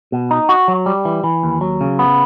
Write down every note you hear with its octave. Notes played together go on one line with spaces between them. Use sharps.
B2
D#4
F#4
F#3
G3
E3
E3
D#2
F#3
C#3
B3